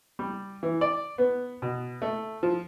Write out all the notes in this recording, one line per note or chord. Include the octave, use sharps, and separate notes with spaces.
G3
E3
D5
B3
B2
A3
F3